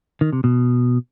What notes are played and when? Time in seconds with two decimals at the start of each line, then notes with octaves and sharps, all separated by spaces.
0.21 D#3
0.33 C3
0.44 B2